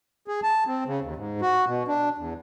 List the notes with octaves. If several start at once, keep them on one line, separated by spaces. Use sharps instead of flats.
G#4
A5
C4
C#3
D#2
G#2
F#4
B2
D4
E2